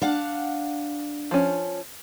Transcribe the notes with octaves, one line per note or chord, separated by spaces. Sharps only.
D4 F5 F#5
F3 C#4